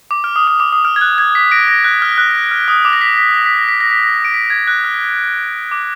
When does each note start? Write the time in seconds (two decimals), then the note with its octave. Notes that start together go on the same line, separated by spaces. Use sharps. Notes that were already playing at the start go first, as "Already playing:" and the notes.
0.11 D6
0.24 F6
0.36 D#6
0.47 D#6
0.60 D6
0.73 D#6
0.85 F6
0.96 G#6
1.01 F#6
1.18 G#6
1.35 B6
1.51 A#6 D7
1.68 A#6
1.84 F#6
2.02 F6
2.18 F#6
2.51 F6
2.68 D#6
2.85 D6
2.93 A#6
3.01 B6
3.18 B6
3.34 A#6
3.46 B6
3.57 A#6
3.68 B6
3.81 A#6
3.91 B6
4.03 A#6
4.25 D7
4.34 B6
4.50 G#6
4.67 F#6
4.84 F6
5.72 D6